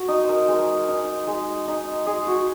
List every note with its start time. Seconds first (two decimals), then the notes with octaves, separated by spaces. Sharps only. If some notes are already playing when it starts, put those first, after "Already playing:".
Already playing: F#4
0.08 D#4 D#5
0.24 C5
0.29 A#4
0.48 G#3 A#4
0.88 D#4
1.27 G#3
1.67 D#4
2.07 G#3 G#4
2.27 F#4